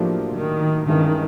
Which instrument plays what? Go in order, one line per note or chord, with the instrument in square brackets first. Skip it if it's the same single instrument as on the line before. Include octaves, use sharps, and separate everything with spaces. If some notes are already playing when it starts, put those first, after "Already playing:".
Already playing: [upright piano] A2 F#3 A#3 D4 G4 [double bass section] F3
[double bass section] D#3
[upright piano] G2 E3 G#3 C#4 [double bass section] D#3